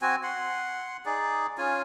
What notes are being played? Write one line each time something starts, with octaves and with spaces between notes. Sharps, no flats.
C4 F#4 G#5
F#5 C6
D#4 G#4 D5
C#4 F4 G#5